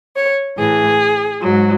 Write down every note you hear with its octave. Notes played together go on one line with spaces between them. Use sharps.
C#5
A2 E3 G#4
G#2 F#3